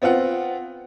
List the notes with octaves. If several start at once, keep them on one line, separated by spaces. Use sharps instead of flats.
B3 C4 F4 F#5